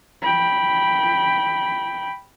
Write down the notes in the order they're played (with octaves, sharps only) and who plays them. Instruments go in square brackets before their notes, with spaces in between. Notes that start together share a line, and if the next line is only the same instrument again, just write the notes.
[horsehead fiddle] G5 B5